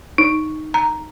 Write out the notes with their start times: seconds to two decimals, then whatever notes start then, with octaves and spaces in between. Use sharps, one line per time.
0.18 D#4
0.74 A#5